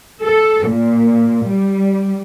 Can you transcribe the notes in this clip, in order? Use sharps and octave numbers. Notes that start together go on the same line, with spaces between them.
A4
A#2
G3